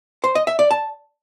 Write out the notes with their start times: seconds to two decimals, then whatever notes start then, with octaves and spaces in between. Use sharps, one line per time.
0.24 C5
0.35 D#5
0.47 E5
0.59 D5
0.71 A5